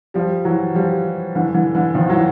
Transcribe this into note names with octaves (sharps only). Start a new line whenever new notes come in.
F3 G3
E3 F#3
F3 G3
D3 E3
D3 E3
D3 E3
D#3 F3
E3 F#3